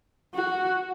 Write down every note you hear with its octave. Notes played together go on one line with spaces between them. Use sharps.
F#4